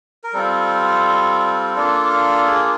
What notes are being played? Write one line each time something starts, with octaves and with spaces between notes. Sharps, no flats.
A#4
G3 C4 F4 A4
A#3 D4 F4
G#4